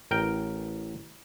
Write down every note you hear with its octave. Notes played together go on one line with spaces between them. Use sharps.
A1 A#4 G5